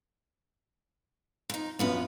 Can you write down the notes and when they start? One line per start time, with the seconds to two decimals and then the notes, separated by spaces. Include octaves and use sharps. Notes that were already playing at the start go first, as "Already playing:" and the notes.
1.50 F2 D#4
1.79 A#1 F#2 B3 F4 B4